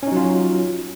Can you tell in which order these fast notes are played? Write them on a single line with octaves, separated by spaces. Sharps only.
C#4 D#4 F#3 F4